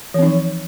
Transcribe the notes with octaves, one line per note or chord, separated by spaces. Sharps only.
E3 F3 C4 D#4